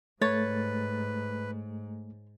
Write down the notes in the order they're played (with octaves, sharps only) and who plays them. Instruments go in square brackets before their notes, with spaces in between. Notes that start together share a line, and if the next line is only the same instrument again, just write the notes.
[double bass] G#2 [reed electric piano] A3 A6 [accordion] B4 [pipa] C#5